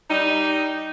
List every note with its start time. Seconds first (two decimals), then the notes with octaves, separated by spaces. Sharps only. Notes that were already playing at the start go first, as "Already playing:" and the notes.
0.09 G3 D#4